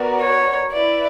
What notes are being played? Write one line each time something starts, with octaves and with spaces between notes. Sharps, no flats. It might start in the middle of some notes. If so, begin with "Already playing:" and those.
Already playing: B3 F#4 A#4 D5
C#5
E4 B4 D5 E5